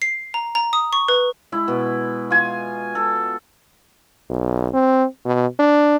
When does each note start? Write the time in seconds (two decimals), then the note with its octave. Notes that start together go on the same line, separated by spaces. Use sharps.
0.02 C7
0.34 A#5
0.55 A#5
0.73 D#6
0.93 C#6
1.08 B4
1.52 G#3 E4
1.68 B2
2.30 F4 G#5
2.95 A4
4.29 B1
4.73 C4
5.25 B2
5.59 D4